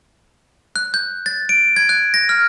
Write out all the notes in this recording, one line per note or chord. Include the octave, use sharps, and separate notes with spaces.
F#6
G6
A6
D7
G#6
F#6
A#6
F6